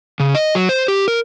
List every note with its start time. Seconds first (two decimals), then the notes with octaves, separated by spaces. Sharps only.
0.20 C#3
0.34 D#5
0.55 F#3
0.69 C5
0.88 G4
1.08 A#4